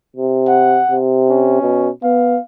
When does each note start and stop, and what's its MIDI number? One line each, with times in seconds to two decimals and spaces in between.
0.16 0.81 48
0.47 0.97 78
0.91 1.58 48
1.29 1.90 61
1.61 1.89 47
2.03 2.38 59
2.03 2.42 77